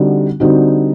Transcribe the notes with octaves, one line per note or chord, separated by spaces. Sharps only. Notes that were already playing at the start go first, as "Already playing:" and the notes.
Already playing: D3 G3 C4 D#4 F#4
D3 G3 C4 D#4 F#4